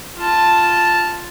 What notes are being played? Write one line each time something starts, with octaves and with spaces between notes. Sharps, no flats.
F4 A5